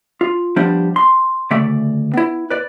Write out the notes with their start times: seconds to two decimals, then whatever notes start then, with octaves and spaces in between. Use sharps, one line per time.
0.21 F4
0.56 F3 G3 B3 D4 C5 F5
0.96 C6
1.51 D2 C#3 A3 D5 E5
2.14 B3 E4
2.50 B4 D5